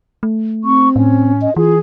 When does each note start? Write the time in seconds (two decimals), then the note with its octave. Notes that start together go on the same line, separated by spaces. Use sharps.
0.23 A3
0.64 C4 C#6
0.96 A2 C#4
1.41 D#5
1.56 E3 F4 G#4